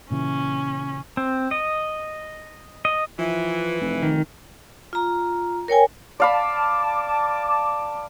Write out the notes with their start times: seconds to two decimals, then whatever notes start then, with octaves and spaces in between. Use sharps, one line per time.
0.11 A#2 C#3 E3 C#4
1.17 C4
1.51 D#5
2.85 D#5
3.19 E3 F3
3.81 F1
4.03 D#3
4.93 F4 A#5
5.68 A#4 C#5 G5 G#5
6.20 D5 F5 A5 B5 D6